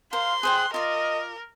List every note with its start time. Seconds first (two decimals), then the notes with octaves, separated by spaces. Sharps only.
0.13 A#4 C5 F5 C6
0.43 G#4 C5 G5 F#6
0.74 F4 A#4 D5 D#5